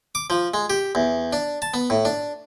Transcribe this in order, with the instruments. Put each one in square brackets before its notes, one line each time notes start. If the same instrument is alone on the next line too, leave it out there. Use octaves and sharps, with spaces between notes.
[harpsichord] D6
F3
G#3
G4
E2
D4
A5
B3
A2
D4